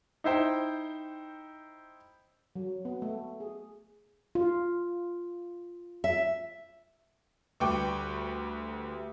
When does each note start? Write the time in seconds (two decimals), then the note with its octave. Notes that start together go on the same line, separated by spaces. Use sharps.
0.24 D#4 E4 C5 G5
2.56 F#3
2.85 B3
3.02 A3
3.40 G#4
4.35 F4
6.04 E5
7.60 D2 G3 B4 G5 C#6 D6